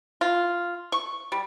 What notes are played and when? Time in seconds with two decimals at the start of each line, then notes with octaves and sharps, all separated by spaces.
0.21 F4
0.92 C#6
1.32 G3